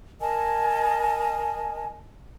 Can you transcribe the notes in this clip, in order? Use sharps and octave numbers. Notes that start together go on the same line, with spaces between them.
A#4 D#5 G#5 A5